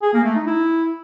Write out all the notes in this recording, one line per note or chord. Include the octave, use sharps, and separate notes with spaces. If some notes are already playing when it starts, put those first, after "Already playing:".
G#4
A#3
A3
D#4
E4